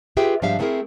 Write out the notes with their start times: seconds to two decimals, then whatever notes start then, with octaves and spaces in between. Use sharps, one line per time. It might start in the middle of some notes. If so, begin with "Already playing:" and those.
0.17 F4 G4 G#4 B4 E5 G5
0.42 G#2 F3 G3 D4 E5 F5
0.59 A3 B3 C4 E4 G#4 A#4